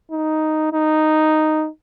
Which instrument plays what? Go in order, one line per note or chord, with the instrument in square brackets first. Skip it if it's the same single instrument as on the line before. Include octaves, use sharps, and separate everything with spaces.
[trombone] D#4
D#4